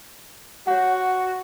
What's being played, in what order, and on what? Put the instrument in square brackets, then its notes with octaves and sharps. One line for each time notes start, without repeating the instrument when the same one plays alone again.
[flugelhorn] F#4 [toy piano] C#5 F#5